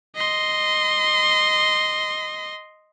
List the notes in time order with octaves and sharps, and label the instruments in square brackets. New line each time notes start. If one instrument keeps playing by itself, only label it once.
[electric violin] D#5 C6